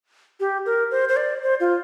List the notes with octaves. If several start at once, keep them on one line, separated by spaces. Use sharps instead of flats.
G4
A#4
C5
C5
D5
C5
F4